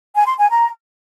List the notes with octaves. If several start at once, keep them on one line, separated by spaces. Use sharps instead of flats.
G#5
C6
G#5
A#5